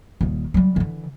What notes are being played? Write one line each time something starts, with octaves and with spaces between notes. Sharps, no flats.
D#1 D#3
F#3 G3
D3 E3